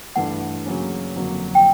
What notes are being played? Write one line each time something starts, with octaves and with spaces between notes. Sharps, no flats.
G2 E3 A3 F#5
C#3 F#3 A#3 C#4
F2 D3 F#3 A#3
G5